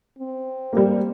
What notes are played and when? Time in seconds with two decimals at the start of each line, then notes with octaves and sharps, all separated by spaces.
0.19 C4
0.73 G3 A#3